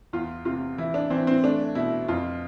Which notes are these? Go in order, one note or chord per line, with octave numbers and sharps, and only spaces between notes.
E2 F4
C3 F4
E3 E4
D4
E3 C4
C4
A3 D4
B2 E4
F2 F4